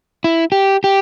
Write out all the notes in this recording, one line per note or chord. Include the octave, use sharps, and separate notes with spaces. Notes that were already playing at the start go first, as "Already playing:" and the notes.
E4
G4
G4